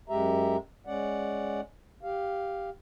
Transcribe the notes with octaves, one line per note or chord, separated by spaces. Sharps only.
F#2 G#3 G4 E5 A#5
G#3 C#4 D5 F#5
G4 F5